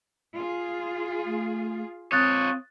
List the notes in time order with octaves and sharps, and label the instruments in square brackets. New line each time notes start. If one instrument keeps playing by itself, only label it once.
[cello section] F4 G#4
[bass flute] A3
[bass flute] C4 [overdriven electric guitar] F4 C#5 [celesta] D#6 F#6 A6